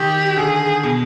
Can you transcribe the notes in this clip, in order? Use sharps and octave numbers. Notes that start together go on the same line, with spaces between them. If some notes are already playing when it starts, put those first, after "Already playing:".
Already playing: D#3 G4
D3 G#4
B2